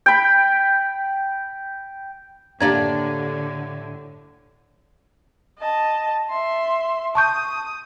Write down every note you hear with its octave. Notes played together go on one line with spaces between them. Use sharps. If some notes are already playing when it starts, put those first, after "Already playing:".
G5 B5
A2 D3 A#3 D4 G4 D5 A#5 G#6
D#5 A5
E5 C6
A5 C#6 D#6 G6